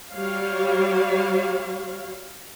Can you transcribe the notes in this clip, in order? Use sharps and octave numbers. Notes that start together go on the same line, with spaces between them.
G3 F#4 C#5 F5